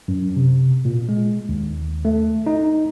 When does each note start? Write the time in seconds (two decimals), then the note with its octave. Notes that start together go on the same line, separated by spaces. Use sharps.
0.08 F#2
0.36 C3
0.85 A#2
1.09 G#3
1.49 D#2
2.05 A3
2.46 D#4